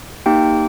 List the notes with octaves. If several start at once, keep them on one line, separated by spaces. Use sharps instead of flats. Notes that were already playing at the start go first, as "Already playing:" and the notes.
A#3 D#4 G4 G5